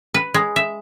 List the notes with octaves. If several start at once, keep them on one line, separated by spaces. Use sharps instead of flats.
B4
G#3
E5